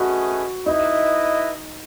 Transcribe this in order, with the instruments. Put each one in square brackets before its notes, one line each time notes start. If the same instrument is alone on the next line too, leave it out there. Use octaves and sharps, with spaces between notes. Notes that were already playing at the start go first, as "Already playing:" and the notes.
Already playing: [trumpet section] A3 C#4 G#4 B4 D#5 [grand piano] F#4
[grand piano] D#4 [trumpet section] E4 B4 D#5